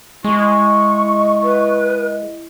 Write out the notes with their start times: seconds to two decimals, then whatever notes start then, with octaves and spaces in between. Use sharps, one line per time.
0.24 G#3 E4 D#5 C#6
1.43 B4